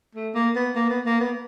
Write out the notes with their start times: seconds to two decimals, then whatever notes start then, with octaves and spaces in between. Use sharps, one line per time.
0.15 A3
0.35 A#3
0.56 B3
0.76 A#3
0.90 B3
1.06 A#3
1.20 B3